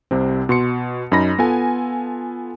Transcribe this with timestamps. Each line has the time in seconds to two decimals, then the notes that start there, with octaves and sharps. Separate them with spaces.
0.11 C2 C3 C4
0.49 B2 C6 C#7
1.12 F#2 D#4 B5 A#6
1.39 B3 F4 A4 G#5